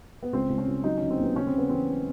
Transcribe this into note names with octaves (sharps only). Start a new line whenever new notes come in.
B3
C#2 C4
C#2
C#4
C#2
F#3 D#4
D3 C#4
C4
D#2 B3
C#3 C#4
C4
C#3
B3
E3 C4